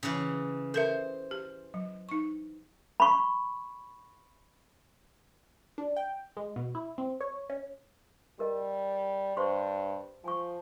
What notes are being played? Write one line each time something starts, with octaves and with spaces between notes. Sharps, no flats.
C#3 E3
A4 A#4 C5 E5
G4
F#3
D#4 C#6
B5 C#6
D4
G5
G#3
B2
E4
C4
C#5
C#4
G3 G4 A#4 D#5
G2 C5 C6 C#6
F3 G#5 C#6